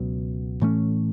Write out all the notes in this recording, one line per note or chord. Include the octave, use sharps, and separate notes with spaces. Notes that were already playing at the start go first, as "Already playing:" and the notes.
Already playing: C#2 B2 F#3
A2 E3 A3 C#4